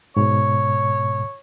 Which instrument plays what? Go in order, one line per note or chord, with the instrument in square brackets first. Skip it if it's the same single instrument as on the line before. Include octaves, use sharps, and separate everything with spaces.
[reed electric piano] G#2 B2 [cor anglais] C#5